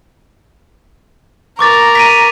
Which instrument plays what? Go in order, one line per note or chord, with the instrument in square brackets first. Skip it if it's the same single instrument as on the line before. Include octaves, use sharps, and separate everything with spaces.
[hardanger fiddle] A#4 [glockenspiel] C#6 D6 A6
[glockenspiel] B6 D7 D#7